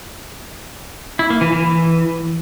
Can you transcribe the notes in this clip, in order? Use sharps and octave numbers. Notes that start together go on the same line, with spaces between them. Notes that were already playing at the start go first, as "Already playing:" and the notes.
E4
A#3
E3
E3